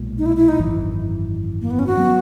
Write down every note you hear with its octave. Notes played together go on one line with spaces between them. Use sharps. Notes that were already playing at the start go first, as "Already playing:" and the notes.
Already playing: B1 A#2 G#3
D#4
E4
E4
D#4
G#1 F#2 E3
A#3
B3
C#4
F#4
F#3 B3